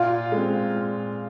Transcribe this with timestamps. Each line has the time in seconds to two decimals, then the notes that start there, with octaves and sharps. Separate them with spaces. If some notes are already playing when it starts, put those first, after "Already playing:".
Already playing: A#2 F4 F5
0.32 G#3 C4
0.74 A#2